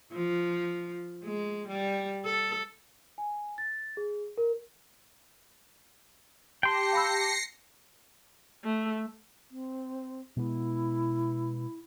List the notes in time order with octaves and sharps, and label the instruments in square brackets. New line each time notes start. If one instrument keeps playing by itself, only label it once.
[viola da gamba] F3
G#3
G3
A4
[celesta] G#5
A6
G#4
A#4
[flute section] G4 A5 [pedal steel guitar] G5 C6 [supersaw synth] A#6 C7 C#7
[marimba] F5 B5 E6
[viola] A3
[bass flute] C4
[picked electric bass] B2 G#3 B3 [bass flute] E4